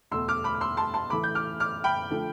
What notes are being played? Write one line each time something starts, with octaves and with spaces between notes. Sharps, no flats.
E2 B2 A3 C6 E6
D6 F6
B5 D6
D6
C6 E6
A5 C6
A5 C6
A2 E3 A3 B5 D6
G6
D6 F6
D6 F6
G5 B5
D3 F3 A3